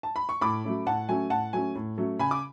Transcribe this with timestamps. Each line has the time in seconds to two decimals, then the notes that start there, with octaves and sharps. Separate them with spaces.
0.03 A5
0.16 B5
0.29 C#6
0.41 A2 B5 D6
0.64 F#3 A3 C#4
0.86 A2 F#5 A5
1.09 F#3 A3 C#4 G#5
1.30 A2 F#5 A5
1.53 F#3 A3 C#4 G#5
1.75 A2
1.98 F#3 A3 C#4
2.19 C#3 G#5 B5
2.31 D6